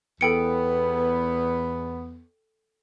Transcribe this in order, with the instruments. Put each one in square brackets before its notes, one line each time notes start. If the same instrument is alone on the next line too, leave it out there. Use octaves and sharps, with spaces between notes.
[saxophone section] E2 B3 [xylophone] A4 G5 C#7